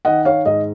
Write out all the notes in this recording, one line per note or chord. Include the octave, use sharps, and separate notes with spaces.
D#3 D#5 F#5
C#5 F5
G#2 D#5